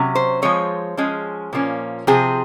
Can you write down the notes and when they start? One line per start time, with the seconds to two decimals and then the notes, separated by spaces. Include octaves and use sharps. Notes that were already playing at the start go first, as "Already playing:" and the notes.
Already playing: C3 F#3 C#4
0.15 C5
0.42 F3 G#3 C4 C#5
0.97 F3 G#3 C#4
1.53 A#2 F3 A#3 C#4
2.07 C3 F3 C4 G#4